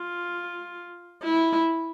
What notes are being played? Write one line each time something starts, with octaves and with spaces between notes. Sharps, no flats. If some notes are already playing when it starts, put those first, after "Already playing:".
Already playing: F4
E4